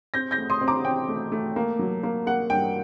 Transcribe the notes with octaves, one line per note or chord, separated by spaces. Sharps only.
C4 G6 A#6
G6 A#6
A3
C6 D#6
C4
A#5 D6
C4 G5
A3
A3
A#3
F#3
A#3
A#3 F#5
G2 G5